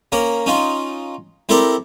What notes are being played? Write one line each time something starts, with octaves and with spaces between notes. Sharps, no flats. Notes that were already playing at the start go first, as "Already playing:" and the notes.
A#3 C#4 A#4
C#4 D#4 F4
C4 E4 G4 A4 A#4 D5